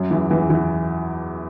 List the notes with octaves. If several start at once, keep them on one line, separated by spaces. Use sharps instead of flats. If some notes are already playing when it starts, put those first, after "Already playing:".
Already playing: F#2 F#3
E2 E3
E2 E3
E2 E3